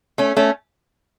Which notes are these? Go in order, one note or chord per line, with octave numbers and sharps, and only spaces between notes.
A3 C#4
A3 C#4